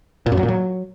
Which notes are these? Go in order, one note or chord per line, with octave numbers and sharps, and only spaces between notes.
A#2
F#2
F#3
A#2
F#3